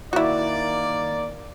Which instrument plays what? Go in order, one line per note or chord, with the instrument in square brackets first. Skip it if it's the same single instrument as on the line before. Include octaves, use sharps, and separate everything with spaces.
[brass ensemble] D#3 A#3 D5 [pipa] E4 F#4